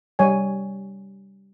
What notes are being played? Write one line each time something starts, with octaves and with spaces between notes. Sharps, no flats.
G3 C#5 G#5